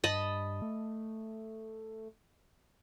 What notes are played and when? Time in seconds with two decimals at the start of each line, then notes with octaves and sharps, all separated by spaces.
0.04 G2 D#5 A5 B5
0.62 A3